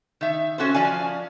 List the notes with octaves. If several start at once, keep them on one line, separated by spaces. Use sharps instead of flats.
D#3 E5
C#4 F#4 A4 C5
F3 D5 F5 G#5